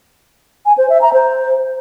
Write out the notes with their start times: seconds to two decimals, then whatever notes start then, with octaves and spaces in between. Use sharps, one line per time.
0.66 G#5
0.78 C5
0.90 E5
1.01 A#5
1.13 C5